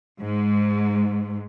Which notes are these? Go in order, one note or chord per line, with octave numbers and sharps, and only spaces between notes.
G#2